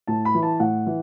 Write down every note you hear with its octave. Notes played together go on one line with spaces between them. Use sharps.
A2 A5
B5
E3
A5
A2 F#5
E3